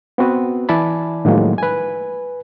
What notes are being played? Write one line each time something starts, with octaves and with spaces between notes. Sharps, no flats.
B3 C4 F#4 B4
E3 E4 D5 G#5 A5 B5
A2 D#3 F3 F#3 G#3 A#3
B4 G#5